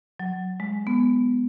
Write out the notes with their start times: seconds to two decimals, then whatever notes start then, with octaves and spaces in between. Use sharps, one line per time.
0.20 F#3
0.60 G#3
0.87 B3